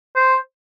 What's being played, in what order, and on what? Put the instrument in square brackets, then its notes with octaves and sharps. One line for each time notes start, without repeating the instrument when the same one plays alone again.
[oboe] C5